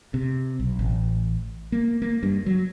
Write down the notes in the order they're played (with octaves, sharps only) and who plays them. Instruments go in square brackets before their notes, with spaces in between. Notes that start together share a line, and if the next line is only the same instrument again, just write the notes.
[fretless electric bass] C3
B1
A1
A#3
A#3
G2
F#3